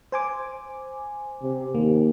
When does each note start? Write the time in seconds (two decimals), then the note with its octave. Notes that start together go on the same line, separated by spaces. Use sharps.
0.12 C5 G#5 D6
1.42 C3
1.75 D#2 A#3